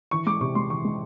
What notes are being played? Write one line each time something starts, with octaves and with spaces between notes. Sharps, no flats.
E3 C#6
G#3 D6
C3 C#6
G#3 C6
E3 C#6
G#3